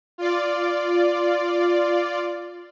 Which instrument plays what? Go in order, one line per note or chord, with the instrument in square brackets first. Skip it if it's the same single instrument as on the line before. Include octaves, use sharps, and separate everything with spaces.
[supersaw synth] F4 D5